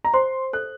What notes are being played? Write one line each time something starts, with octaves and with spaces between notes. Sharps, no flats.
A#5
C5 C6
A4 F#6